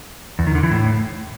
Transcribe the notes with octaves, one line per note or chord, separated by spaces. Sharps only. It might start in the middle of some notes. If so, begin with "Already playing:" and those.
E2
D#3
D3
E3
A2